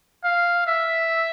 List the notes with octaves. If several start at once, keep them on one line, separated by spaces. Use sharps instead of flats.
F5
E5